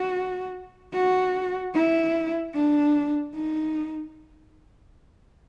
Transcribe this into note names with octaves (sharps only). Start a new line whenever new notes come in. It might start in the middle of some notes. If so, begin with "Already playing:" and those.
Already playing: F#4
F#4
E4
D4
D#4